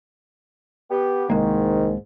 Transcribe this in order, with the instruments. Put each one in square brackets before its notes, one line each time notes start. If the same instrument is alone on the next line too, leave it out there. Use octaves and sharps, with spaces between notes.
[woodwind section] B3 G4
[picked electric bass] C2 G#3 A#3 [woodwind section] G#2 [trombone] D#3